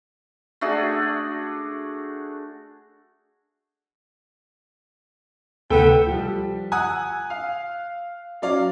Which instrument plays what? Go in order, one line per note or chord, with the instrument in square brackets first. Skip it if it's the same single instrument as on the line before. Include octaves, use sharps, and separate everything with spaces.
[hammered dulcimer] A3 D4 F#4 G#4
[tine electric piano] D2 C3 [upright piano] A3 [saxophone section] B3 A4 [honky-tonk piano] G5
[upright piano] F3 G3
F#5 G#5 D#6 E6 F#6
F5
F#3 C#4 D5 F5